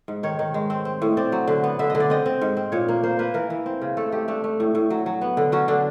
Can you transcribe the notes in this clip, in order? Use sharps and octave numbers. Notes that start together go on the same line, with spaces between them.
G#2
D#3 C#5
D#3
G#3
C4
C4
A2
C4 D5
F#3
D3
B3
D3 E5
D#5
D3
D5
C4 D#5
C4
G#2
C4
A#2 C#5
A#3
A#3 C5
A#3 B4
E3 A#4
E3
C4
C#3
A3 A4
A3 G4
A3 D4
A3
A2
A2
F#3
F#3
B3
D3
F#3 C#4
D3 D4